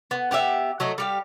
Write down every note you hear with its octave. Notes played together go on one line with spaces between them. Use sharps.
B3
B3 G4 G#4 E5
F#3 A3 D#5
G3 G4 F5